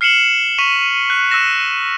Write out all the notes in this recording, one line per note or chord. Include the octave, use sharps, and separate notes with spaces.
F6 C7 C#7 E7 F#7
C#6 B6 D#7 F7
F#6
E6 F#6 A#6 E7